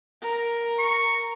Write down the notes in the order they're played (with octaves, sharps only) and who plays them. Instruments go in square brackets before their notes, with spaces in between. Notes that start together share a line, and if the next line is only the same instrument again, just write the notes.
[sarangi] A#4
[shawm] C#6